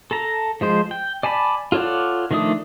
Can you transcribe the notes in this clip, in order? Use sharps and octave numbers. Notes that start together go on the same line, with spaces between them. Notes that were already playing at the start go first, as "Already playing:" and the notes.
A4 A5 A#5
F3 G#3 C5
G5
D5 G#5 A5 B5
F4 A4 C#5 D5 F#5
D#3 F3 A3 D4 D#6